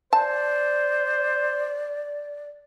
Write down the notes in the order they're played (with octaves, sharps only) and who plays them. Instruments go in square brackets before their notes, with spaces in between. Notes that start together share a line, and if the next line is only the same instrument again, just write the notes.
[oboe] C5 [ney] D5 [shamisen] A5